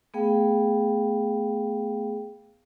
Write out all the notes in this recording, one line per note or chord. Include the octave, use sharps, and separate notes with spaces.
A3 B3 G#4 F5 G5